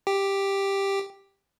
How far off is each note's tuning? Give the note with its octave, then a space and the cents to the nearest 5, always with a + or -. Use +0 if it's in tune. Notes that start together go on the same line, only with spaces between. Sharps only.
G4 +5